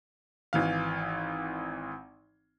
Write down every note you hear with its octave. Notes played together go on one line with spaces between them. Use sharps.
G#1 E3 F5